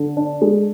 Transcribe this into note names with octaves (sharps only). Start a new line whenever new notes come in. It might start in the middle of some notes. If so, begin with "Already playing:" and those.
Already playing: D3
D4
G#3